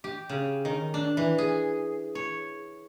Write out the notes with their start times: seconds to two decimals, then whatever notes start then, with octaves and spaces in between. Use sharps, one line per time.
0.04 G4
0.29 C#3
0.65 D#3
0.94 D4
1.17 E3
1.38 G#4
2.15 C#5